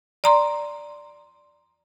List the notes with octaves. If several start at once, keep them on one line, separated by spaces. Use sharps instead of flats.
D5 A#5 C6